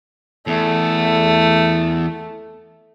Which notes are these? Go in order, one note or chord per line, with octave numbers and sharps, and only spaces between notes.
E2 A3